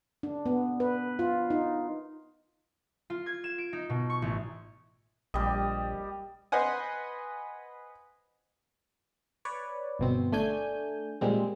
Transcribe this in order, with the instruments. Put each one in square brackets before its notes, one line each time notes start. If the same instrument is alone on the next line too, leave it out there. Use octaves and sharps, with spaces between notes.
[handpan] D4
B3
B4
F4
D#4
[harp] F4
G#6
E7
D7
D#4
B2
C#6
A1
[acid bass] A#1 [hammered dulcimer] G3 G4 D#5
[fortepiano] B4 C5 D#5 F#5 G#5
[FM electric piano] B4 C#5 D5
G1 B2 C4
A3 D4 G#5 G6
A#2 G3 G#3 A#3 C4